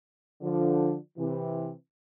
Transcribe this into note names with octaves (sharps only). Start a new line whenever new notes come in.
D3 F3
C3 E3